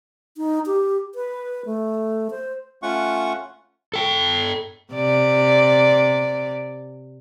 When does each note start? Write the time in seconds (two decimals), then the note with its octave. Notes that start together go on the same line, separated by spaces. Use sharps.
0.37 D#4
0.66 G4
1.15 B4
1.66 A3
2.30 C5
2.82 A3 C#4 F4 F#5 C#6
3.94 A4 G5
4.93 C3 D5